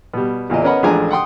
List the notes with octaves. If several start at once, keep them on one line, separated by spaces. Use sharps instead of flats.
B2 G3
E2 A#2 E3 D#5
B3 C#4 A#4 D#5 F#5 B5
A1 F3 G#3 D4 G#5 A#5
F#5 G5 C6 D#6